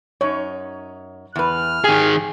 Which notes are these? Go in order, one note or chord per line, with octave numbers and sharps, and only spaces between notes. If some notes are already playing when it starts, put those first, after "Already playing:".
F#2 D#4 C#5
E2 B4 F6
D#3 G4 G#4 G#5